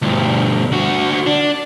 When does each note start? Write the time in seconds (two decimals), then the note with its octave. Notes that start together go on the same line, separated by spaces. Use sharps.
0.02 D2 G2
0.72 D3 F#4
1.26 D4